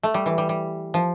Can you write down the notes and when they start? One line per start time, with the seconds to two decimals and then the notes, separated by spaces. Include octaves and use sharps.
0.03 A3
0.14 G3
0.26 E3
0.38 G3
0.49 G3
0.94 F3